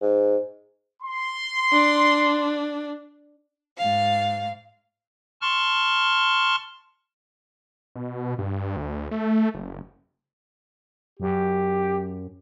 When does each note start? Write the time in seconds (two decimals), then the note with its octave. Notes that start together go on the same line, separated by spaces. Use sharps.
0.02 G#2
1.03 C6
1.73 D4
3.77 G#2 F5
5.42 A5 C6 C#6 F6
7.96 B2
8.38 G2
8.76 D2
9.11 A3
9.54 F#1
11.20 F#2 G4